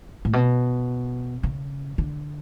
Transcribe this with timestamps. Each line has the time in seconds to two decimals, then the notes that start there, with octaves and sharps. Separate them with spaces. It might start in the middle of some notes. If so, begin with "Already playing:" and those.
0.25 A2
0.33 B2
1.43 C#3
1.98 D3